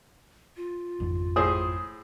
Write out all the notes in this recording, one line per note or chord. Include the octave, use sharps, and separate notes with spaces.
F4
G#1 F2
A2 G#4 C5 D#6